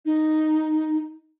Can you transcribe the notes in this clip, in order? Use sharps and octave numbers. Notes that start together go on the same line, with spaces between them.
D#4